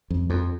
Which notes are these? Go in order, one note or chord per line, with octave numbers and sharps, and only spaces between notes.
F2
F2